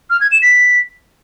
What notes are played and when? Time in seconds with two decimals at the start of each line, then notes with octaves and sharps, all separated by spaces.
0.10 F6
0.21 G#6
0.32 E7
0.42 B6